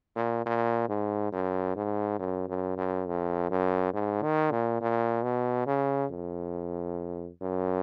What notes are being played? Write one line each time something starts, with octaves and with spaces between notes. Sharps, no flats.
A#2
A#2
G#2
F#2
G#2
F#2
F#2
F#2
F2
F#2
G#2
D#3
A#2
A#2
B2
C#3
F2
F#2